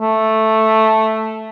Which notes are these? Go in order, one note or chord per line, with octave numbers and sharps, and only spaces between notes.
A3